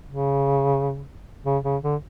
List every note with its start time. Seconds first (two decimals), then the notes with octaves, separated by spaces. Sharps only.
0.09 C#3
1.45 C#3
1.64 C#3
1.83 D3